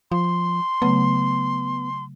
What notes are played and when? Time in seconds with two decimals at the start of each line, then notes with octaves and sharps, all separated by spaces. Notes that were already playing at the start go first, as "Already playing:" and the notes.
0.12 F3 C6
0.82 C#3 F#3 A3 B3